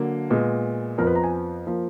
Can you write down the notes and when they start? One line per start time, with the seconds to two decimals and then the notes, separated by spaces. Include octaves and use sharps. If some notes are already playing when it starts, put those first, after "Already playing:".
Already playing: D3 F#3 A#3
0.30 A#2 G#3 B3
0.98 F2 F3 B3 A#4
1.07 B4
1.15 A#5
1.24 G#5
1.67 F3 A#3